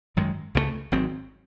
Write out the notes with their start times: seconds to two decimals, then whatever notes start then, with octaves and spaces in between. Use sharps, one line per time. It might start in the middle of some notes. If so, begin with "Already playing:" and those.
0.16 G#1 F#2 D#3 G#3
0.55 C#2 C#3 E3 A3
0.92 G#1 G#2 F#3 C4